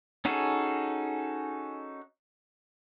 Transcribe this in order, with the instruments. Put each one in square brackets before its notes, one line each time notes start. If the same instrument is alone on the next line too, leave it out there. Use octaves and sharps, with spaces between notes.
[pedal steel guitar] C#4 D#4 F#4 G#4 A4